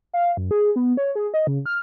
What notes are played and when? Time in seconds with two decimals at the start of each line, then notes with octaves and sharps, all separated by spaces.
0.13 F5
0.37 F#2
0.51 G#4
0.76 B3
0.97 C#5
1.15 G#4
1.34 D#5
1.47 C#3
1.66 F6